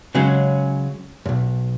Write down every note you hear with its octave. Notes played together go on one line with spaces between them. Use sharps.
C#3 F#3 G#3 C#4
B1 F#2